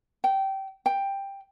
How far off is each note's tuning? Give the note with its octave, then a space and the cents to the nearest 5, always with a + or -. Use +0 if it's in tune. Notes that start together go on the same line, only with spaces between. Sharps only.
G5 -20
G5 +10